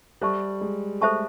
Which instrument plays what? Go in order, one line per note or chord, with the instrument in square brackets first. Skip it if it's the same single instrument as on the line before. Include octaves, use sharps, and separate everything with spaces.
[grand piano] G3 [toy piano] A4 C5 E5 A5 C#6
[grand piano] G#3
[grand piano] A3 [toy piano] A4 C5 E5 A5 C#6